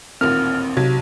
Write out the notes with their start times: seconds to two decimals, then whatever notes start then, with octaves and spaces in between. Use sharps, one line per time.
0.21 A1 D#2 A#2 C4 F6
0.77 B1 C3 F#4 G#6